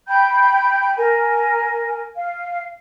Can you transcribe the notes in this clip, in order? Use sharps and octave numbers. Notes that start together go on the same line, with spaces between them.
G5 B5 G6
A#4 G#5
F5